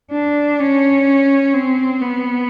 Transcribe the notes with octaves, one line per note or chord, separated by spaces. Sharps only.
D4
C#4
C4
B3